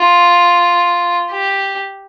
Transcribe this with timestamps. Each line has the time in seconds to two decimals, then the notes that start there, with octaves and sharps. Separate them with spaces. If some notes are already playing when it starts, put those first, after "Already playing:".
Already playing: F4
1.31 G4